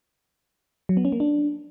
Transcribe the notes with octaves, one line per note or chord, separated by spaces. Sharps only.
F#3
B3
C#4
A#3
D4